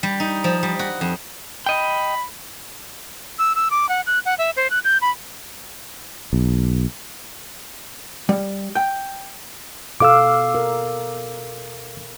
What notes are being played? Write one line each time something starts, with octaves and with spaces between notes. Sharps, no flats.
G3
D#4
F3
G3
F#4
F2
D#5 G5 B5
E6
E6
D6
F#5
F#6
F#5
E5
C5
F#6
G6
B5
B1
G3
G5
B2 A4 F5 D6 E6
A#4